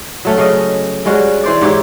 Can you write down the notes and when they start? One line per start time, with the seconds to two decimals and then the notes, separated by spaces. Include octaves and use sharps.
0.25 F#3 A3 C#4
0.38 C#3 C#4 D#5
1.05 G3 G#3 C#4 F#4
1.44 E3 C5 D5
1.61 G#2 G4 C#5 E5